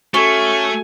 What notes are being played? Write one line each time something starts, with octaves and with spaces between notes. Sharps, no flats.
A3 C#4 F#4 A4 G#5